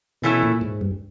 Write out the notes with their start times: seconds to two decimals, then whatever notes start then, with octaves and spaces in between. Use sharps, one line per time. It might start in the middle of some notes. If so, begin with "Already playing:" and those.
0.22 B2 E3 A3 C#4 E4
0.43 A#2
0.61 G#2
0.81 G2